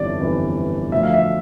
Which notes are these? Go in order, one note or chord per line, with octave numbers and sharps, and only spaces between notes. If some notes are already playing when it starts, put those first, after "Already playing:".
Already playing: G1 F2 E3 G3 D5
G1 F2 E3 G3
D2 D3 F3 E5
F5
E5